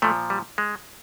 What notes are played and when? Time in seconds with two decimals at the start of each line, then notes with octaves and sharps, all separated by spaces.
0.02 A#2 F3 A3
0.30 G3
0.58 G#3